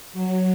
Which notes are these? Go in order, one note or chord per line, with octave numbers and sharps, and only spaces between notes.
F#3